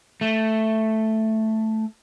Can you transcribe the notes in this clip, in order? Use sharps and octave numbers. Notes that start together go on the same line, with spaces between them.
A3